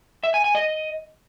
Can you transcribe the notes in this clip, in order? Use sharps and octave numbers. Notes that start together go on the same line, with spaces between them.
E5
G#5
G#5
D#5